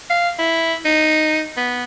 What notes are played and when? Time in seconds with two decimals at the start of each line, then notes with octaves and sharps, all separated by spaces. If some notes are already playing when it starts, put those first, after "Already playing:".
0.10 F5
0.39 E4
0.85 D#4
1.57 B3